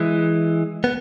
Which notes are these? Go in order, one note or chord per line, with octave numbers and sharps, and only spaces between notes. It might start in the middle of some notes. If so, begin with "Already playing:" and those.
Already playing: E3 G#3
B3